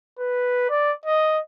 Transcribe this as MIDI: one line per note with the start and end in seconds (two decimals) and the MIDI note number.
0.19 0.68 71
0.70 0.93 74
1.05 1.38 75